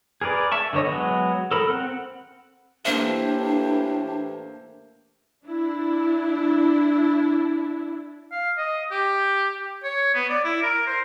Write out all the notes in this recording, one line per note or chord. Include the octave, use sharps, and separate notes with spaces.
G#4 A#4 B4 D5
E5 A5 C#6
D3 G#3 B3 C#5 D#5
F#3 G#3 B3
A4 A#4 B5
C4 F#5
A2 E3 A#3 D4 G4 C5 E5
D4 E4
F5
D#5
G4
C#5
B3
D5
E4
A#4
C5